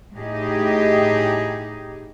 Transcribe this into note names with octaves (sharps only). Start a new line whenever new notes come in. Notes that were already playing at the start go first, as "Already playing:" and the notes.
A2 D#4 G4 G#4 D#5